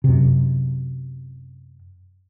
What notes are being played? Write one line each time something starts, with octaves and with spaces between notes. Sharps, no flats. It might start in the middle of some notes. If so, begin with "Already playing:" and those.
F#2 C3